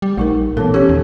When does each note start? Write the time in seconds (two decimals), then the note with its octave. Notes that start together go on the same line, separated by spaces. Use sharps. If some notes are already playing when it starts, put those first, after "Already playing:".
0.02 G3
0.17 A#1 A3 D#4 A#4
0.57 A#2 E3 B3 A4
0.74 C#4 G4 C#5
0.89 D#2